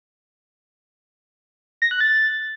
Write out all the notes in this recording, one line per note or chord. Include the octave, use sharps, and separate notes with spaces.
A#6
F#6
A6